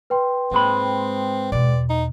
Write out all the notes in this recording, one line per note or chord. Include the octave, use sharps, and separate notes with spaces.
B4 G5 C6
G#2 G#3 A#3 C4 B5
E2 B2 D5
D#4